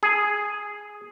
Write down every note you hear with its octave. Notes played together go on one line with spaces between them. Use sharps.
G#4